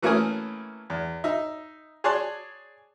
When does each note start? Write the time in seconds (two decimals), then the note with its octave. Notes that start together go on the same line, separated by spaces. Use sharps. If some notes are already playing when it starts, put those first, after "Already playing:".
0.02 E3 A3 A#3 C#4 G#5 D#6
0.90 E2
1.24 D#4 E5
2.04 G#4 C#5 D5 A5 C6 F#6